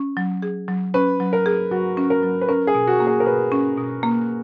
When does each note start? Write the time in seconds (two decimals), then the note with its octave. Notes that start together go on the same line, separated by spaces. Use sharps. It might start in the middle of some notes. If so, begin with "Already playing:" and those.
Already playing: C#4
0.17 F#3
0.42 G#4
0.68 F#3
0.94 C#4 B4
1.20 F#3
1.33 A#4
1.46 G#4
1.71 F#3 F#4
1.97 C#4
2.10 A#4
2.23 F#3
2.41 B4
2.49 C#4 A#4
2.67 G#4
2.75 B2
2.87 F#4
3.00 A#3
3.07 G#4
3.20 A#4
3.26 B2 B4
3.52 C#4
3.77 B2
4.03 A#3